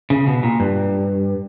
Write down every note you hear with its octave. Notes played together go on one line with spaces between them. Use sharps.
C#3
B2
A#2
G2